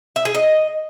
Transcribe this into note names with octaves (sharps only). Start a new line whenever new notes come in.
E5
G#4
D#5